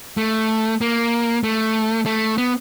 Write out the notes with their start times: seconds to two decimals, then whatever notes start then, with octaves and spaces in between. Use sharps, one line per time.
0.17 A3
0.81 A#3
1.43 A3
2.06 A3
2.38 B3